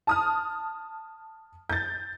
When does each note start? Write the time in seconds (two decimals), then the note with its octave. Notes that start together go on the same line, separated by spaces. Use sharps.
0.07 A5 D#6 F6
1.69 G6 A6